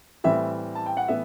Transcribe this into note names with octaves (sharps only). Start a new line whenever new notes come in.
A2 E3 G3 C4 E5
A5
G5
F#5
A2 E3 B3 E5